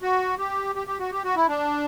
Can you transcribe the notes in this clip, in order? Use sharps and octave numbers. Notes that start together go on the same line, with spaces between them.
F#4
G4
G4
G4
F#4
G4
F#4
E4
D4